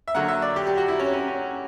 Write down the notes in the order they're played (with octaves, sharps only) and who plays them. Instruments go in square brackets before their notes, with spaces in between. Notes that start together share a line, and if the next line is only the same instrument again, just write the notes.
[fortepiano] E5
D3 F#3 A#3 F#5
E5
D5
G4
G4
F#4
E4
C#4
C#4
C#4